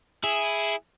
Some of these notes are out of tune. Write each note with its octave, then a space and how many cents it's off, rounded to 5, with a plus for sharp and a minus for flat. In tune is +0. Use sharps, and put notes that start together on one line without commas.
E4 +0 G#4 +0